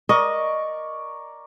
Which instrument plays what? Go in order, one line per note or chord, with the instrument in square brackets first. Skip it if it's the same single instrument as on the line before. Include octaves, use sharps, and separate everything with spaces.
[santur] A#4 D5 C#6 [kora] D#5